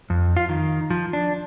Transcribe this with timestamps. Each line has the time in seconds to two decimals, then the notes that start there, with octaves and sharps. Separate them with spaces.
0.10 F2
0.37 F4
0.49 D#3
0.90 F3
1.13 D4